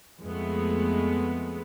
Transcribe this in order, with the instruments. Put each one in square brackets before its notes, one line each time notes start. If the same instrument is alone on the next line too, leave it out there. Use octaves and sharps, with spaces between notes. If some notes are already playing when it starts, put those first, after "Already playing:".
[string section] F2 G#3 A3 B3